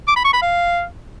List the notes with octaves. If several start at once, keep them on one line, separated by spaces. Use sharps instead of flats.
D6
B5
C#6
B5
F5